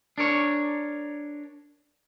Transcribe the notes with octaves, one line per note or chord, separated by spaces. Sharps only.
D4 A#4 C#5